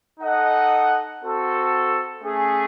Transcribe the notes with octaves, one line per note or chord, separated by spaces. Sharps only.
D#4 A4 D#5 F#5
C4 F#4 A4
A3 C#4 G#4